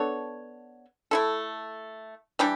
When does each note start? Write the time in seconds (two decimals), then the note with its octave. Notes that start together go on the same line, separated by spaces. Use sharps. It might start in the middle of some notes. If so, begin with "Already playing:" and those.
Already playing: B3 D4 A4 C#5
1.11 A3 E4 A4
2.39 E3 G3 D4 G4